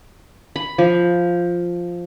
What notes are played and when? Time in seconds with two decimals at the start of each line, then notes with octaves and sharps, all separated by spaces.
0.56 B5
0.78 F3